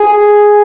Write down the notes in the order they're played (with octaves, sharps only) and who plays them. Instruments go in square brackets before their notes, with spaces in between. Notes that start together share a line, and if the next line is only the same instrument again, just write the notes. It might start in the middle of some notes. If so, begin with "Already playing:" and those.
Already playing: [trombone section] G#4